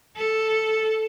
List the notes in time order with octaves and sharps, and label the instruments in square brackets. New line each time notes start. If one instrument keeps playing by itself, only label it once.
[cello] A4